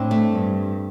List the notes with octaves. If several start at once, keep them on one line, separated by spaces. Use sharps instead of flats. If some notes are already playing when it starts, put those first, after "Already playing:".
Already playing: A2 C4 D4
A3
G2